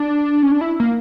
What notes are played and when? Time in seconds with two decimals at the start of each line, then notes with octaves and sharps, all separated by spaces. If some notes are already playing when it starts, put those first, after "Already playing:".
Already playing: D4
0.43 C#4
0.52 D4
0.61 E4
0.80 A#3